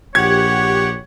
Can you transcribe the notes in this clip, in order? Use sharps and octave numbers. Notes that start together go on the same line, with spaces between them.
A#1 G4 C#5 F#5 G#6